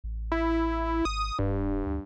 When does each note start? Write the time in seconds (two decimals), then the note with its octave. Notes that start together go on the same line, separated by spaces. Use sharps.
0.04 A1
0.32 E4
1.05 G#1 D#6
1.39 D#1 G2
1.86 D2